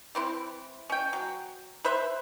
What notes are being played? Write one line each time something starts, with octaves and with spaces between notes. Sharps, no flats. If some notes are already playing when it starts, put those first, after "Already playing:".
E3 C4 E4
C#4 G5
F#3
B4 C5 E5